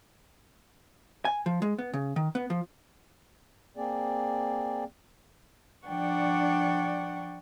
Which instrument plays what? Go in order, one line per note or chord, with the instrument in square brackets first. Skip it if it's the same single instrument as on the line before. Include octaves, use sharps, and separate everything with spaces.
[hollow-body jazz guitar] G#5
F3
G#3
B3
C#3
D#3
B3
F3
[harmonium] A#3 C4 G#4 D5
[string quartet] F3 D4 D5 F#5 G5 C#6